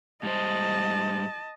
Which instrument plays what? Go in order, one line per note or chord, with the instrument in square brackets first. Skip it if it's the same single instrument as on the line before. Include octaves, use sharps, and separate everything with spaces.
[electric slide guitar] G#2 G3 C5 [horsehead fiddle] D#5 A5